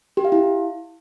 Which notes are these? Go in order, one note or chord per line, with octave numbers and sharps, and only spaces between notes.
G4
F5
E4